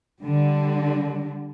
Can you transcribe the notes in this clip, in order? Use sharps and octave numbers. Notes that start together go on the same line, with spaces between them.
D3 G3